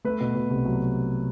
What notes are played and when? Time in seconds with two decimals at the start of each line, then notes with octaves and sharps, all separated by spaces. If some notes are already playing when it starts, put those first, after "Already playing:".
0.05 A3 B4
0.20 B2
0.35 B2
0.50 C2
0.65 F#3